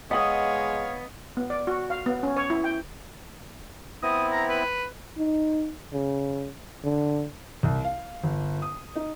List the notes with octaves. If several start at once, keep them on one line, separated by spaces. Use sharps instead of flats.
G#3 B3 C#5 D#5 F5 F#5 D#6
B3
D5
F#4
F5
B3
C#4
C#5
E4
G5
B3 C4 E4 D#6
A#5
B4
D#4
C#3
D3
C2
F5
G1
D#6
D#4